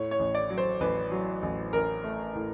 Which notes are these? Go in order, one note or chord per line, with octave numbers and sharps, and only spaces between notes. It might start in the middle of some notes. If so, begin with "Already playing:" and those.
Already playing: A2 C#5
C#5
A1
D5
F#3
C5
A1 B4
F#3
A1
A1 A#4
A3
A2